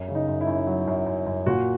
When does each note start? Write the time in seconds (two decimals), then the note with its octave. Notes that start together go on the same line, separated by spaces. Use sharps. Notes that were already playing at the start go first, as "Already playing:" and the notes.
Already playing: F#2
0.08 C#3
0.15 D#4
0.28 F#2
0.41 E4
0.47 F#2
0.67 F#3
0.87 F#2
1.06 F#2
1.26 F#2
1.46 A#2 F#4